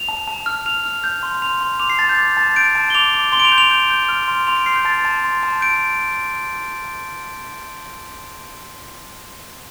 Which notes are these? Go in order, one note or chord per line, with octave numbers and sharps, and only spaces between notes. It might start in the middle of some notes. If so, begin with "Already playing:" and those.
Already playing: F7
A5
A5
F6
F6 F7
F6
G6
C6
C6 F7
C6
D6 F7
C7
A5 A6
G6
D6 A6
A5 A6
G6 D7
A5
G7
D6 F7
D6
C6 G7
D7
F7
G6
F7
G6
G6
F6
C6
C6 F7
D7
F6 C7
G6
A5 A6
A5
C6
A5
G6 D7